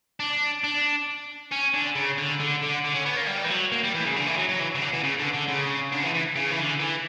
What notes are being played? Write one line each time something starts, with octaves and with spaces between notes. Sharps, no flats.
D4
D4
C#4
D3
C#3
D3
D3
D3
D3
C#4
B3
A#3
G3
E3
F#3
A#3
G3
E3
C#3
D3
E3
F#3
F#3
E3
C#3
D3
E3
C#3
D3
D3
C#3
D3
E3
E3
C#3
E3
D3
E3